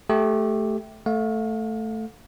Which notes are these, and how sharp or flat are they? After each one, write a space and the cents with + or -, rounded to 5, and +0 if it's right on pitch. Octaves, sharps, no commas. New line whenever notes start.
A3 -10 G4 +0
A3 +0 F5 +35